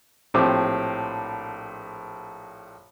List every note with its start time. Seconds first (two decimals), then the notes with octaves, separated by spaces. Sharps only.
0.34 A#1 A2 C4 G4 C5 D6